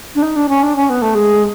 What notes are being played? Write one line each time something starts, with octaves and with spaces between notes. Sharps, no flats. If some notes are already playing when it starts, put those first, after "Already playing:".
D4
D#4
D4
C#4
D4
C#4
B3
A3
G#3